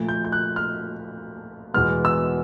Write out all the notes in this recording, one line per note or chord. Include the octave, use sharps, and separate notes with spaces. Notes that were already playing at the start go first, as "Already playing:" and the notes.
Already playing: A#2 F3 A3
G6
G6
F#6
F6
E2 B2 G#3 B3 F6
E6